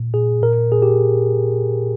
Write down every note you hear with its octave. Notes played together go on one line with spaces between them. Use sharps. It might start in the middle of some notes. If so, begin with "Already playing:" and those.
Already playing: A#2
A#2 G#4
A#2 A#4
A#2 G#4
G4